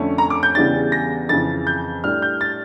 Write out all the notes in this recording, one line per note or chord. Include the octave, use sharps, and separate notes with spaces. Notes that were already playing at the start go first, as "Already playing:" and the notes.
Already playing: F2 D3 A3 C#4
A#5
D6
G6
E2 C#3 E3 G3 D4 A6
A#6
F2 C#3 E3 A6
G6
A2 G3 D4 F6
G6
A6